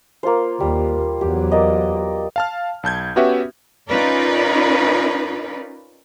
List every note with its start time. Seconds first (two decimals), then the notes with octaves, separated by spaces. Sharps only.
0.23 A#3 F4 C5
0.60 D#2 G3
1.21 E2 F#3 G4
1.52 A#3 D5 D#5
2.36 F5 A5 F6
2.83 B1 A5 G6 G#6
3.16 B3 C#4 F#4 G4 B4 E5
3.88 C#4 D#4 F4 A#4 B4 D5